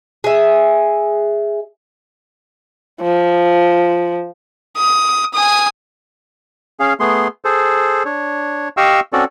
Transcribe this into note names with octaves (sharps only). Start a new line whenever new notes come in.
G#4 E5
F3
D#6
G#5 D#6
C#4 G#4 F5
A3 B3 G#4 C6
G#4 A4 C5
D4 C#5
G4 D#5 F5 G5 C#6 E6
C4 C#4 F#4 A4 D5